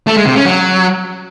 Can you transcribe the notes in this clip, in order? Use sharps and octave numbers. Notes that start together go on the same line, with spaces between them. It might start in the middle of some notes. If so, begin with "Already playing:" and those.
A3
G#3
C3
C#4
F#3